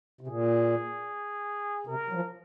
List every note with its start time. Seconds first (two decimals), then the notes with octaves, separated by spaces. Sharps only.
0.21 C3
0.27 A#2 G#4
1.87 C3 A#4
2.09 F#3
2.13 F3